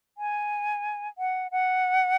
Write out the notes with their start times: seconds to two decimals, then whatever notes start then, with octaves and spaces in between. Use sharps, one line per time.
0.18 G#5
1.18 F#5
1.52 F#5